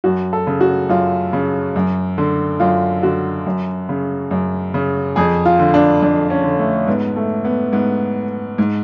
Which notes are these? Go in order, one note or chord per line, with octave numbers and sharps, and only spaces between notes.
F#2 F#4
A4
C#3
F#4
F#2 F4
C#3
F#2
D3
F#2 F4
D3 F#4
F#2
C#3
F#2
C#3
F2 G#4
F4
D3
D4
F2 D4
C#4
D3
A3
G#2 B3
A3
B3
G#2 B3
G#2